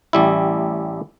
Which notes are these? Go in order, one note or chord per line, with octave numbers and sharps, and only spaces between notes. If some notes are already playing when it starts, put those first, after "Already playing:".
A1 G3 E4